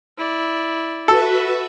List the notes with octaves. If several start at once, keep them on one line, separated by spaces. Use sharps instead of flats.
E4 D5
F#4 A4 B4 E5